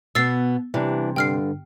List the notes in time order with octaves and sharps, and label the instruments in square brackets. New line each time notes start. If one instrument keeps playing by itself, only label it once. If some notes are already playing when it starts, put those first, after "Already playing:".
[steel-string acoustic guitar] B2 B3 [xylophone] E6 A6 C7
[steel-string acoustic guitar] C3 [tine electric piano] E3 G3 D4
[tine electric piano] G2 D3 [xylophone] G5 F6 C7